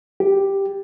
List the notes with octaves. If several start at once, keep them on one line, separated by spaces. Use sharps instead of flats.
G4